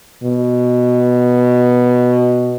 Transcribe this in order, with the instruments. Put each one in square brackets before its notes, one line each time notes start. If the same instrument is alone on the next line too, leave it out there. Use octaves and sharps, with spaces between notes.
[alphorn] B2